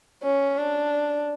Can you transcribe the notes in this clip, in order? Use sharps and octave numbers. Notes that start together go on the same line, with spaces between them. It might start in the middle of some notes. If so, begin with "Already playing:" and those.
C#4
D4